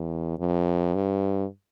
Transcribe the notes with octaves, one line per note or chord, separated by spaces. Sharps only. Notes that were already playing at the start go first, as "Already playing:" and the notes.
Already playing: E2
F2
G2